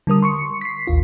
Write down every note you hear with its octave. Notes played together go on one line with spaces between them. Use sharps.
D3 G3 A#4 D#6
C6 C#6 C#7
B6 C7
A1 D#2 F4